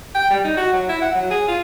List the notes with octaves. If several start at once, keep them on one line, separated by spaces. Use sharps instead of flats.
G5
G3
D#4
F#4
F#3
E4
F#5
F#3
G#4
F4